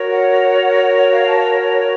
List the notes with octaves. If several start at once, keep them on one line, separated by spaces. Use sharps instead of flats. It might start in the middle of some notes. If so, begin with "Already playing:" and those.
Already playing: F#4 A#4 C#5
F#5
F5
A5